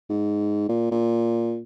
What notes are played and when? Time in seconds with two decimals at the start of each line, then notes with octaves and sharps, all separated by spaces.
0.10 G#2
0.69 A#2
0.91 A#2